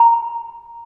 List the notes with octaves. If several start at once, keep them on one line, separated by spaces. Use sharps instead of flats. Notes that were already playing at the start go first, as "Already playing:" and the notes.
Already playing: A#5